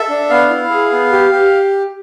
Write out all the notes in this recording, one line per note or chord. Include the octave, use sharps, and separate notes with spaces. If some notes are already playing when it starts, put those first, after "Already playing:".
Already playing: A4 E5
D4
B3 F5
E4
G#4
B3
G4
G4